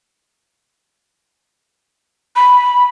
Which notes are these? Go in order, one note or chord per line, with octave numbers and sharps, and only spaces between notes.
B5